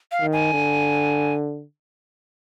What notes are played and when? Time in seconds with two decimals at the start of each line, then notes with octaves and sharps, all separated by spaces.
0.12 F5
0.22 D#3
0.33 G#5
0.53 D3